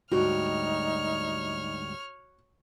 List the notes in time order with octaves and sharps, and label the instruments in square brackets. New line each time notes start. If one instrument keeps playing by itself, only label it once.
[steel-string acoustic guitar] D2 G#2 G3 [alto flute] D#4 [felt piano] F#4 [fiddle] C#5 F6